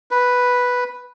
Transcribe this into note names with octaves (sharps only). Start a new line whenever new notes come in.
B4